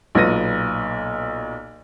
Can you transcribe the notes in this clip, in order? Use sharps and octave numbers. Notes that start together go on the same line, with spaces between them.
B1 A#2 B3 A#6 D#7